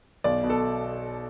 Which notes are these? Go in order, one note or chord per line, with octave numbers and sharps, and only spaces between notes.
B1 D5
B2
A4